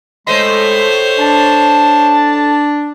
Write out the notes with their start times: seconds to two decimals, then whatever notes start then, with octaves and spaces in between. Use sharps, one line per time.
0.27 A2 G#3 A3 C5 C#5 D#5 C6
1.19 D4 A5